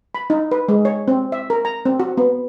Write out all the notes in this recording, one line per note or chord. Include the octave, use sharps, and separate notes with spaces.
B5
D#4
B4
G#3
C#5
C4
E5
A#4
A#5
C4
F#4
B3